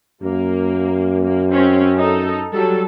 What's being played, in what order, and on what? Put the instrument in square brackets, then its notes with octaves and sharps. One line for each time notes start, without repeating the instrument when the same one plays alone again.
[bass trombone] F#2 [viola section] A#3
[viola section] A#3
C4 C#4
D#4 A4
F#3 G3 A4